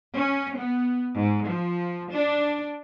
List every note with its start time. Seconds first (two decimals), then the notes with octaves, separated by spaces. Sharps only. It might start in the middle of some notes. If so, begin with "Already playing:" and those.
0.15 C#4
0.57 B3
1.16 G#2
1.49 F3
2.12 D4